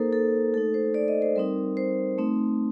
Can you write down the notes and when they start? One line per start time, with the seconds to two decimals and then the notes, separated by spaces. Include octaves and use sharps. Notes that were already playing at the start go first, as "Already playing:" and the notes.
Already playing: A#3 D#4 A4 A#4 C5
0.13 A4
0.54 A3 D#4 A4
0.74 C5
0.94 D5
1.08 D#5
1.22 C5
1.36 G3 C4 D#4 A#4
1.77 C5
2.18 A3 C4 D#4